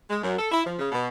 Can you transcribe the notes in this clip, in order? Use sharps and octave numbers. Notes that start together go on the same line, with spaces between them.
G#3
F#2
A4
E4
F3
C#3
B2